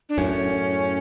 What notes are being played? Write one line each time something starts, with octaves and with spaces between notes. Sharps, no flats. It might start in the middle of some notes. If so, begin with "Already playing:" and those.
D4
F#2 A2 C#4